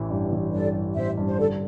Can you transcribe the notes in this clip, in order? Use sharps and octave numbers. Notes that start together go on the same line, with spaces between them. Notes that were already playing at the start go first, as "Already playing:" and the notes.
Already playing: A1 E3
G2
E3
G2 A4 D5
G2
A1 C5 E5
G2
C5
D3 A4 D5